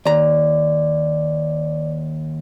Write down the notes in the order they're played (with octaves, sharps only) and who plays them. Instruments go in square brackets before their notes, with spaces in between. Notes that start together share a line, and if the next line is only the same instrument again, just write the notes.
[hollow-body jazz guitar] D#2 A#5 [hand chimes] D5